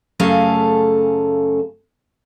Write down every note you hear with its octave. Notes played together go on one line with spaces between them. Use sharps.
F#2 C#3 A3 G#4 A4 F5